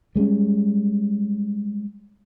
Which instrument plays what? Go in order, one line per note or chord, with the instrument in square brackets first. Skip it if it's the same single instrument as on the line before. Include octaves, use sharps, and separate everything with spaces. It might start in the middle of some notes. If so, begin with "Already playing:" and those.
[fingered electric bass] G3 G#3 C4 C#4